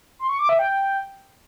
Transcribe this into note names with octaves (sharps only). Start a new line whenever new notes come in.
C6
C#6
D6
E5
G5